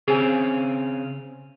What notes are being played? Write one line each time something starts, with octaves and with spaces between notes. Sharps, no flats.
C#3 C4 C#4 G#4 G#5